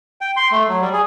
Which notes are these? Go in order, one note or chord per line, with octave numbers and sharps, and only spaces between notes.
G5
C6
A3
F#3
G3
G#4